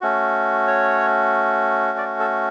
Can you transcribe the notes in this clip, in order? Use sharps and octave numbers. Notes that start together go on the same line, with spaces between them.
A3 C#4 F#4
C#5
D5
A4